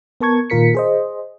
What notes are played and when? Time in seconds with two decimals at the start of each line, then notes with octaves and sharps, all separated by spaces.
0.21 B3 A#4 A5 C#6 G#6
0.50 A#2 D#3 F4 A#4 B6 C#7
0.75 G#4 C5 D#5